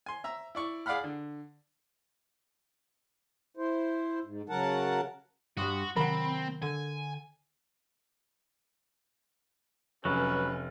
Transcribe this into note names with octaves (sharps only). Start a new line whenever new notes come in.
G#5 C6
E5 A#5 E6
E4 D5 C#6
G#4 D5 F5 F#5 B5 F6
D3
E4 C5
G#2
C#3 F#3 A#4 F#5 A5
G2 G3 F#4 C6 D#6 F#6
C3 D#3 F#3 C4 A#4 F#5 B5
D3 G#5
F1 F#3 C#4 B4